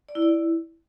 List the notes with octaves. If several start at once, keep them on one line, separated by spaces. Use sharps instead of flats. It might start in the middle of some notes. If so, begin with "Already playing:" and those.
D5
E4
D5
E4